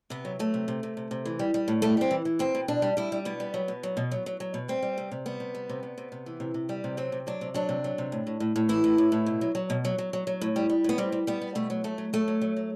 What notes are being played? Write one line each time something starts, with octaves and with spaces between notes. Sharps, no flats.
C3 B3
F#3
F#3 A3
C3
C3
C3
C3
C3
E3
G3
G3
A2
G3 A3
G3 C4
E3
E3
B2 C4
B2
B2 D4
G3
G3 E4
G3
B2 B3
G3
F#3
B2
F#3
B2
F#3
F#3
F#3
B2
G3 C4
G3
C3
C3
G3 B3
C3
G3
C3
C3
C3
C3
E3
C3
C3
G3
C3
F#3 C4
C3
F#3 D4
C3
F#3 D4
C3
F#3
C3
A2
A2
A2
A2
E3 E4
A2
A2
A2
B2
F#3
F#3
B2
F#3
F#3
F#3
F#3
A2
G3
G3
A2 B3
G3 C4
G3
G3 B3
G3
B2 A3
F#3
F#3 A3
F#3
F#3 A3
F#3
F#3
F#3